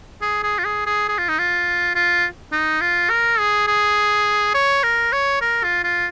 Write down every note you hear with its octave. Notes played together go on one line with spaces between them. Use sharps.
G#4
G#4
F4
G#4
G#4
G#4
F4
D#4
F4
F4
D#4
F4
A#4
G#4
G#4
C#5
A#4
C#5
A#4
F4
F4